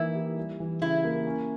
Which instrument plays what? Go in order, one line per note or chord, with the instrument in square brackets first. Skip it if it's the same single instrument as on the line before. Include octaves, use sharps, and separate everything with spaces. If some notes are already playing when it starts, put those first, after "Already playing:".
Already playing: [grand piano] E3 A#3 D#4 [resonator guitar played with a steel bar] E4
[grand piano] G4
G3
E3
[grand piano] C#3 [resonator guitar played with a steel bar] E4
[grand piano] A#3
C#4